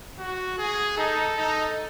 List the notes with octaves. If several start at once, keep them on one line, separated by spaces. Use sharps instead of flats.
F#4
G#4
D#4 A4
D#4